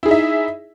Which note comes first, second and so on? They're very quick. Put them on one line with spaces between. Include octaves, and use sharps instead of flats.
E4 G#4 D#4 E5